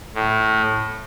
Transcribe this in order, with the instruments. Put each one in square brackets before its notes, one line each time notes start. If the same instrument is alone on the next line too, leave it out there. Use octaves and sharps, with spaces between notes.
[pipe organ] A2